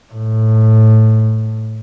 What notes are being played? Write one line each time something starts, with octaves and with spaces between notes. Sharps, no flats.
A2